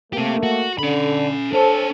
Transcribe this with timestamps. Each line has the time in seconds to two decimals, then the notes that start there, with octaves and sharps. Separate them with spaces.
0.13 A3 A#3 C4 G4
0.43 F#4
0.79 D3 C#4 B5
1.53 D4 A4 C5 C#5